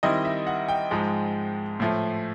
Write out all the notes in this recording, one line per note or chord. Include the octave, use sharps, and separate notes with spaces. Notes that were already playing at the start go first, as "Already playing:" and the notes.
D#3 G3 C4 E4 D#5
E5
F#5
G5
G#2 F3 G#3
A2 F3 A3